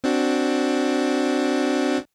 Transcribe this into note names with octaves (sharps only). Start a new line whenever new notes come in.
C4 D4 F#4